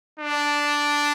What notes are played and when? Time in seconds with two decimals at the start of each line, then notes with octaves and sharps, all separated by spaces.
0.19 D4